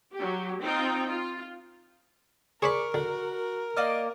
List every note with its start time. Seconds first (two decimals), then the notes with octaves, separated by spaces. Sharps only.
0.13 F#3 G4
0.61 C4 D#4 F4 G5
1.07 F4
2.62 G#4 A#4 C5 D5 B5 C#6
2.94 D3 F#4
3.34 A#4
3.76 A#3 D5 D#5 F6